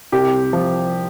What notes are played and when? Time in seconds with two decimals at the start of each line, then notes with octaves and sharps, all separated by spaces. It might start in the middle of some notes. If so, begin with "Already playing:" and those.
0.12 C2 G4
0.53 F3